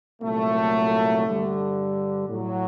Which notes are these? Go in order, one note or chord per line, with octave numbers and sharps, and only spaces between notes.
C2 A#2 F#3 A3
G2 D3 G3
A2 F#3